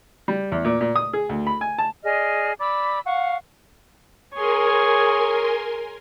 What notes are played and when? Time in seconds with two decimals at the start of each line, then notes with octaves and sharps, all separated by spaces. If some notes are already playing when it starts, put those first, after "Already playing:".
0.28 G3
0.52 E2
0.65 A#2
0.81 A#2
0.96 D#6
1.13 G#4
1.29 D2
1.47 B5
1.61 G#5
1.78 A5
2.03 G#4 D5 D#5 F6
2.60 D5 B5 D6 E6
3.05 F5 F#5 C#6
4.34 G#4 A#4 C#5 G#5 C6